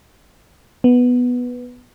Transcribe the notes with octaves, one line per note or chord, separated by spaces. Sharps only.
B3